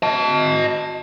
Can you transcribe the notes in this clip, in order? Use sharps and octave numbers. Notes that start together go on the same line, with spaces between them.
D#5 A5